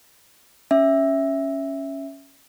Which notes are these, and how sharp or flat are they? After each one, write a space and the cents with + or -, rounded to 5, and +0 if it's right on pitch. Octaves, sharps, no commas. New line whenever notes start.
C#4 +0 E5 +0